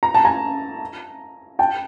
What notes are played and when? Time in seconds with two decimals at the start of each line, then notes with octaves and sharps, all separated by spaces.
0.03 A#5
0.14 A5
0.25 G#5 A#5
1.59 G5 A5